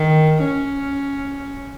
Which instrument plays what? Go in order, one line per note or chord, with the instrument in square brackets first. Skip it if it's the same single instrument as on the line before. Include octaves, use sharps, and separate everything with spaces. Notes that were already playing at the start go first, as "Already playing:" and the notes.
Already playing: [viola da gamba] D#3
C#4